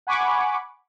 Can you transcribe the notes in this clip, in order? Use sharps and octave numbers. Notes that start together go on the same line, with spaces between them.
F#5 G#5 B5 C#6 D6